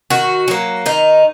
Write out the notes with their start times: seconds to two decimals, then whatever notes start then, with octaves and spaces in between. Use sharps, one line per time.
0.10 D#3 F#4
0.48 F#3 A#3
0.86 D#3 D#4